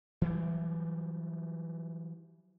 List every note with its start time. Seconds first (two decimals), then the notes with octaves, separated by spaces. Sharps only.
0.22 E3 F#3 G3